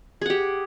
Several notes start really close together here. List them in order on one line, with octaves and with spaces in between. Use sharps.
G#4 F#5 G4